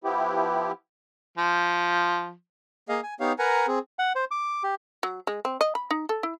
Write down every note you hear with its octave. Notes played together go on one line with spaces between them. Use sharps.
F3 B3 E4 G4
F3
A#3 G#4 D#5 F5
G#5
B3 D#4 G4 C#5 F5
A#4 B4 F#5 G#5 A#5
C4 G#4
F#5
C5
D6
G4
F#3
G#3
C4
D#5
B5
D#4
A4
E4